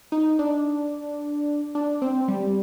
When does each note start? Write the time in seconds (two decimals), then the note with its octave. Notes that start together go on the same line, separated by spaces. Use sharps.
0.12 D#4
0.39 D4
1.75 D4
2.02 C4
2.28 G3